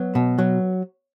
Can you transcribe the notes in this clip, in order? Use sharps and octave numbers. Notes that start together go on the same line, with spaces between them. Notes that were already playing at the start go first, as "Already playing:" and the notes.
Already playing: F#3 B3
B2
F#3